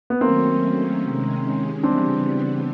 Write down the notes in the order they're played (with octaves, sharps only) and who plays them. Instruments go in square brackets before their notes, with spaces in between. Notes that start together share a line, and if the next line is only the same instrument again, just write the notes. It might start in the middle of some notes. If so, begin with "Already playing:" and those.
[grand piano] B3
[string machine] D#3 F#3 A3 C#4 [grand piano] A#3 C4
[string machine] C3 D#3 G#3 C#4
[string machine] C#3 E3 G3 B3 [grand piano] C4 D4